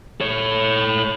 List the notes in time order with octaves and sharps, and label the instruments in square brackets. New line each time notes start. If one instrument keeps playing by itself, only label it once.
[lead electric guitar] A4 C#5